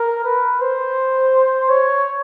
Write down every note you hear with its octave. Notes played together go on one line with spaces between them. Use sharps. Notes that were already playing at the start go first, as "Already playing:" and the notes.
Already playing: A#4
B4
C5
C#5